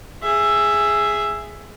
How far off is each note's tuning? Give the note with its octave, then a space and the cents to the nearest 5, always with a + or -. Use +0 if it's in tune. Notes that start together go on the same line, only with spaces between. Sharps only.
G#4 +0 E5 +10